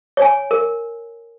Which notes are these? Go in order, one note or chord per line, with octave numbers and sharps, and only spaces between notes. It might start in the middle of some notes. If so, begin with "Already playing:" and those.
C#5 G#5
A#4